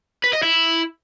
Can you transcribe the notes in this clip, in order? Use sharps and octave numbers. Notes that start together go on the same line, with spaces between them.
B4
D#5
E4